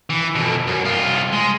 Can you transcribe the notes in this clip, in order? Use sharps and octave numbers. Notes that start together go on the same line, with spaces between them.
E3
F2 B2
F#2
C2 F4
G#3